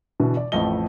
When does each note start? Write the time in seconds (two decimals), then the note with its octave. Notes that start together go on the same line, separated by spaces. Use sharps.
0.20 B2 D3 E3
0.37 D5
0.52 A1 F2 A3 D#5 G7